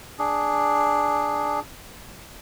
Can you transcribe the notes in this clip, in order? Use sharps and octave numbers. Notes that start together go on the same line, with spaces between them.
D4 G#4